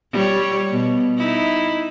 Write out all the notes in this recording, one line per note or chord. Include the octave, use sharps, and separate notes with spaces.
G3 C#5
B2
D#4 E4